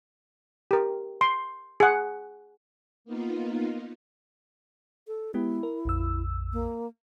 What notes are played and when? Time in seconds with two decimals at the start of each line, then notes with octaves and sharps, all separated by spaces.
0.71 G4 A#4
1.21 C6
1.80 G#4 F#5
3.05 A#3 B3 D#4 F4
5.08 A4
5.34 G#3 B3 E4 G4
5.63 A#4
5.85 A#1 F2 E6
6.53 A#3